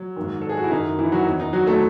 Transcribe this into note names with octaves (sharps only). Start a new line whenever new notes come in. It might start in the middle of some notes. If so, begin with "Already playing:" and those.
Already playing: F#3
G#2 D#3
A4
G#4
F#4
E4
F#2 D#3 D#4
E3 E4
F#3 F#4
E2 D#3
D#4
F#3 F#4
A3 A4